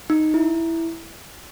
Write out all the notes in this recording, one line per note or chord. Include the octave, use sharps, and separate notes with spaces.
D#4
E4